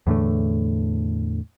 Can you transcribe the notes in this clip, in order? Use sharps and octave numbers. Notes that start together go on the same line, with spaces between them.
E2 A2 D3 A3